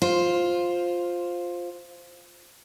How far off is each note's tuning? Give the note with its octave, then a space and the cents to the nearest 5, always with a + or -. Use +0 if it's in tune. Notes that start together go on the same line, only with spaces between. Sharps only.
F4 +5 C5 +0